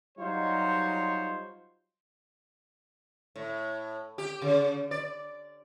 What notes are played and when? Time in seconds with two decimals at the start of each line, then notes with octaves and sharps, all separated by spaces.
0.18 F#3 G3 D#4 F4 C5 C#5
3.36 A2
4.18 G4
4.42 C#3
4.91 D5